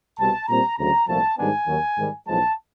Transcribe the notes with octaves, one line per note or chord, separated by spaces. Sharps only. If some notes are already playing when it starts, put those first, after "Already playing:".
C2 B2 G3 C4 A5
A#2 G3 C4 A#5
D2 C#3 F#3 A#5
C2 A#2 F3 A3 A5
G#2 D#3 G3 B3 D4 G#5
D#2 D#3 F#3
G#2 D#3 G3
B1 A2 F3 G#3 A5